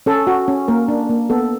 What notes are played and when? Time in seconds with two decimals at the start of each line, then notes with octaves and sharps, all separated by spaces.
0.06 C#4 A4
0.27 F#4
0.48 C#4
0.68 A#3 A#4
0.88 D4
1.09 A#3
1.30 B3 A4